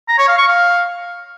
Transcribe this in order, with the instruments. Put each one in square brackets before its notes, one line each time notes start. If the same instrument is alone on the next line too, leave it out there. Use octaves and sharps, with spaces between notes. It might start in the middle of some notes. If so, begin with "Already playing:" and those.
[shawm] A#5
C#5
F5
C#6
F5